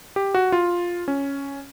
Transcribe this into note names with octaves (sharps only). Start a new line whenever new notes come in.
G4
F#4
F4
C#4